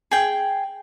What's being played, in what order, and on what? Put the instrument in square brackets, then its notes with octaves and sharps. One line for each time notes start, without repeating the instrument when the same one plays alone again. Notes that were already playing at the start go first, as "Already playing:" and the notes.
[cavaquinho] G#4 G5